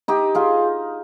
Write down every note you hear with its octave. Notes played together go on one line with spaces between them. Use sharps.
D#4 G4
F4 G#4